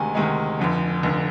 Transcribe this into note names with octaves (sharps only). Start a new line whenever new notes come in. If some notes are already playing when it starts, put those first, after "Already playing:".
Already playing: D2 C3 D#3 G#3 G#5
D2 C3 D#3 G#3
F1 F2 D3
F1 F2 D3